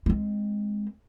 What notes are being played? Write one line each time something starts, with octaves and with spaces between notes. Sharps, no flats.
G#3 C4